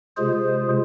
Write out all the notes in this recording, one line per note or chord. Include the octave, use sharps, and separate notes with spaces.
C3 G#3 F4 G#4 C5